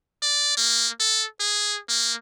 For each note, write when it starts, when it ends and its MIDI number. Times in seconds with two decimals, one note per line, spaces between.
0.22 0.56 74
0.57 0.89 58
1.00 1.26 69
1.40 1.79 68
1.89 2.14 58